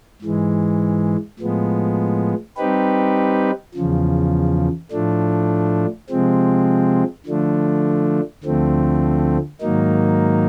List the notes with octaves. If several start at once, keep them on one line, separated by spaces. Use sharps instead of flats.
G#2 E3 G#3
A2 F3 G#3 B3
G3 C4 D#4 G4 B4
E2 C#3 F3
A2 F3 A3 D4
C3 F3 G#3 C4
D3 F3 A3 D4
D2 D3 F3 A3 C4
G#2 D#3 F#3 A#3 D#4